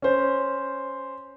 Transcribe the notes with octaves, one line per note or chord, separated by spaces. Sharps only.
C#4 C5